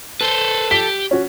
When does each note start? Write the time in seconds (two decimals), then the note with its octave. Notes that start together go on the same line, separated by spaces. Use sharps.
0.21 A4 B4 C5
0.71 G4 B6
1.11 C#4 F#4